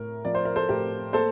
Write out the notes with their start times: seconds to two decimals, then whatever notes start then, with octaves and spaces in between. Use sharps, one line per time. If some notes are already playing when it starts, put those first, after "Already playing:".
Already playing: A2 A#4
0.25 F3 D5
0.35 C5
0.45 A#4
0.56 A4 C5
0.69 A2 G4 A#4
1.13 A#3 A4 C5